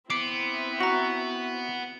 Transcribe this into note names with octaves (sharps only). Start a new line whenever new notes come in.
B3 C4 E4 D6 C7 D7
F#4 A#5 F#7